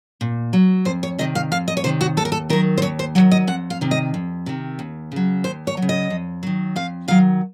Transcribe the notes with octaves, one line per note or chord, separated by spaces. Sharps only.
A#2
F#3
F2 C5
C#5
C3 D#3 D#5
F5
F2 F5
D#5
C#5
C3 D#3 C5
F#4
D#2 A4
A#4
A4
D#3 F#3 A#4
C5
D#2 C#5
C5
D#3 F#3 C#5
D#5
F2 F#5
F5
C3 D#3
D#5
F2
C3 D#3
D#2
C#3 F#3
D#2 C5
C#5
F#3
C#3
D#5
F2
D#3 F#3
F2 F5
D#3 F#3 F5